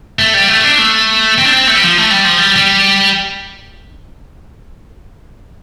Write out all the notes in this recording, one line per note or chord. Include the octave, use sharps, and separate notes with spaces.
A3
G3
A3
D4
A3
C4
D4
C4
A3
G3
F3
A3
G3
F3
G3
G3